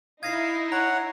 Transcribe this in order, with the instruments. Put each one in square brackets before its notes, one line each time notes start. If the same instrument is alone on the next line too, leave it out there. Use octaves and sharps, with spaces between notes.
[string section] D#4 E4 [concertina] F5 D#6 [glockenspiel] G#6 A#6 C7
[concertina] C#5 F#5 [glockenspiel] A#5